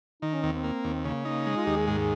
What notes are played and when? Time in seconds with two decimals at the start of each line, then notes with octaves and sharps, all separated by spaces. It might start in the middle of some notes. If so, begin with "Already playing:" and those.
0.22 D#3 D#4
0.33 C#4
0.43 D#2 C4
0.53 C4
0.64 A#3
0.84 D#2
1.05 C#3 A#3
1.25 A#3 D#4
1.46 G#3
1.57 F4
1.66 D#2 G4
1.77 G#4
1.87 G#2 G#4